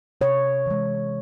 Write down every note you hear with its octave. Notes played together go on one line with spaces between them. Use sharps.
C3 C#5
E3 G#3